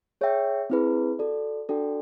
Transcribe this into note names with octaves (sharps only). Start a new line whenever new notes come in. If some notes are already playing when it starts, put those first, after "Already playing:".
G#4 C#5 E5 G5
C4 E4 G#4 B4
F#4 A4 D5
D4 F#4 A4 D5 G5